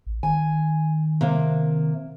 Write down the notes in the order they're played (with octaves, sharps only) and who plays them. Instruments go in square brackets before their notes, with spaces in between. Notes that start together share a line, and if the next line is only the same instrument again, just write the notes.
[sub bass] A1
[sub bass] D#3 [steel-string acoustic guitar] G#5
[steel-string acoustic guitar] C3 A#3